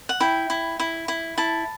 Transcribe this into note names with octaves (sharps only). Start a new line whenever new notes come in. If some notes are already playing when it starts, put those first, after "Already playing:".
F#5
E4 G5
E4
E4
E4
E4 A5